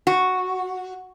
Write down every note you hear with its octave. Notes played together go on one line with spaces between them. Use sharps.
F#4